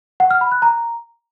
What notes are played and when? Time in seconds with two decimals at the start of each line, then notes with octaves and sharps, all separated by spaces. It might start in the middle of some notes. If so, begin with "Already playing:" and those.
0.20 F#5
0.31 F6
0.41 B5
0.52 F#6
0.62 A#5